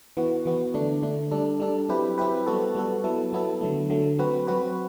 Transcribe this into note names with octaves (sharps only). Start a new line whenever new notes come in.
E3 B3 F#4
E3 B3 F#4
D3 A3 D4
D3 A3 D4
G3 D4 A4
G3 D4 A4
F#3 C4 E4 G4 B4
F#3 C4 E4 G4 B4
G3 B3 F#4 A4
G3 B3 F#4 A4
F#3 B3 E4 A4
F#3 B3 E4 A4
D3 F#3 A3
D3 F#3 A3
F#3 C4 F#4 B4
F#3 C4 F#4 B4